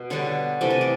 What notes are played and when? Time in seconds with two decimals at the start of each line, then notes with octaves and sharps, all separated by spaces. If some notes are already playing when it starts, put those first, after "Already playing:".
Already playing: B2
0.10 D3 G3 B3 C#5
0.61 C3 E3 A3 D5
0.71 D#5
0.81 D5